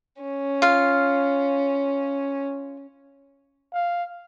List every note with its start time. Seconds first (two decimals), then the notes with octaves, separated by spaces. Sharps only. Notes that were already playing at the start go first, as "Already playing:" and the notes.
0.22 C#4
0.62 F4 F5
3.73 F5